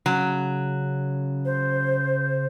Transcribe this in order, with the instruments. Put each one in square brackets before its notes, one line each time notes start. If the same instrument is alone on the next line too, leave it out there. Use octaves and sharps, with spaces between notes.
[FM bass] C#3 [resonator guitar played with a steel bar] F#3
[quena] C5